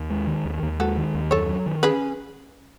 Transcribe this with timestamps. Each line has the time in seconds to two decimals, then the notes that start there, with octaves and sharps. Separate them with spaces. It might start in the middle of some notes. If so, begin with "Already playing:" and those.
Already playing: D#2
0.10 G#3
0.27 D#3
0.45 D#2
0.63 D#2
0.79 G#3 F#4 A4
0.97 D#3
1.14 D#2
1.31 F#2 A4 C#5
1.49 F#3
1.66 D#3
1.83 C#4 G#4 B4